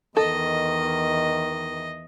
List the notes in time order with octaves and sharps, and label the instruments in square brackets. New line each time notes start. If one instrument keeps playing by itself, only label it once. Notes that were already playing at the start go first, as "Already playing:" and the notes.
[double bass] E2 [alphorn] D#3 [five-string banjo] A4 [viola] D#5